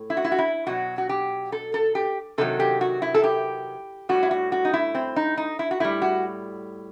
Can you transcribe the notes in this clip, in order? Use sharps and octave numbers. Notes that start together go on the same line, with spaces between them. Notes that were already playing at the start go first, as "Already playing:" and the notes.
Already playing: A2
E4
F#4
E4
F#4
E4
B2 F#3 F#4
F#4
G4
A4
A4
G4
C3 D#3 F#3 A4
G4
F#4
E4
A4
G4
A2 G3 F#4
E4
F#4
F#4
D#4
E4
C4
D#4
D#4
E4
F#4
A2 G3 E4
F#4